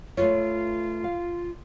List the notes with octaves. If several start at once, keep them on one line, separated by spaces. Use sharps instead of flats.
A3 F4 B4 C#5
F5